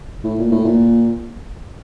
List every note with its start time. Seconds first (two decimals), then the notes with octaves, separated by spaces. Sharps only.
0.24 A2
0.38 A#2
0.51 A2
0.64 A#2